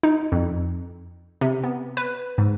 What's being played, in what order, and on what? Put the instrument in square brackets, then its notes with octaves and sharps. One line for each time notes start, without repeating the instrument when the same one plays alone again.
[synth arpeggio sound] D#4
F2
C3
B3
B4
G#2